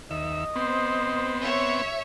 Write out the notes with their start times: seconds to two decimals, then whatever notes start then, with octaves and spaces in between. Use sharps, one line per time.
0.11 D#2 D#5 E5
0.56 B3 C4 C5
1.42 C#5 E5